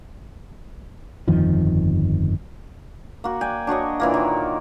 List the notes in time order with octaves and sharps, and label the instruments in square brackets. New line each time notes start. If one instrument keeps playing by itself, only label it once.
[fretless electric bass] G1 F2 D#3 F3
[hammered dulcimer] A#3 F#4
D5 G5 G#5
D4 F#4 C#5 D#5
A#2 E3 A#3
D#3